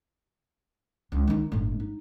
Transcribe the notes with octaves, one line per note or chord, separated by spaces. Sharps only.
C#2 D4
D#3 D#4
G1 A2
D#4